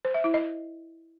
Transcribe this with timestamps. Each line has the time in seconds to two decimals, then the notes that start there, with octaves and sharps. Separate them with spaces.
0.05 C5
0.14 E5
0.24 E4
0.34 D#5